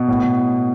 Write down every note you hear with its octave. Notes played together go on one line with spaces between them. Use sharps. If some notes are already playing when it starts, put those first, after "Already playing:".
Already playing: B2
A2
A2